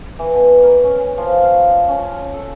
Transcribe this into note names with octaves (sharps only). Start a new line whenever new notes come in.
E3
B2
A#4
C#4
F3
F5
C#4
A4